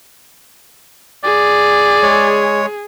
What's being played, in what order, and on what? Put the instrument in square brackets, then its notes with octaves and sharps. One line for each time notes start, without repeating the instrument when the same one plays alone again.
[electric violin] G#4 [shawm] D5
[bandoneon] G#3 C#5